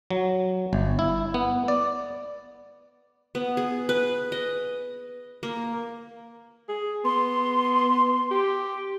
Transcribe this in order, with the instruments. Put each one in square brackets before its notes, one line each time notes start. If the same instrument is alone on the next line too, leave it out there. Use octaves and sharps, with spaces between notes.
[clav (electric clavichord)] F#3
G1
E4
B3
D5
[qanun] B3
G#4
B4
D#5
A#3
[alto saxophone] G#4
[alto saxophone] B3 [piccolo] C6
[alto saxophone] G4